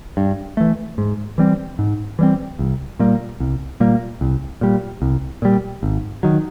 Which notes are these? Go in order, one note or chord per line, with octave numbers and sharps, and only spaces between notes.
G2
E3 A3
G#2
E3 G3 C4
G#2
E3 G3 C4
C2
A#2 G3 A#3
C2
A#2 G3 A#3
C2
A#2 G3
C2
A#2 G3
G#1
D#3 F#3